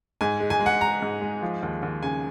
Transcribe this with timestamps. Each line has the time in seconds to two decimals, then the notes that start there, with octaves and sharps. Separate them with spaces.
0.21 G#2 G#5
0.40 G#3
0.50 G#5
0.61 G#3
0.66 F#5
0.81 G#3 A#5
1.02 G#2
1.21 G#3
1.42 F3
1.63 D#2
1.83 D#2
2.03 C#3 G#5